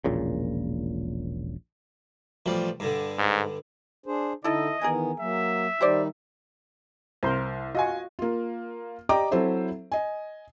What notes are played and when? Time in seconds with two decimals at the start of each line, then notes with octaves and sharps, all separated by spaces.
0.04 E1 A#1 A#2 C#3
2.46 A1 F3 G3
2.80 G2 D3
3.18 G#2
4.06 D4 G#4 C5
4.44 D3 D#4 E4 A4 D#5
4.82 D#3 E3 B3 G#4 A#4 G#5
5.19 F#3 A#3 E5
5.81 D#3 G3 D#4 G4 C5 D5
7.23 C2 A#4 C5 C6
7.75 F4 F#4 D#5 G#5
8.19 A#3 F4
9.09 G4 D5 D#5 G5 A#5 D6
9.31 F#3 C4 E4 A4 C5 E5
9.92 D#5 G#5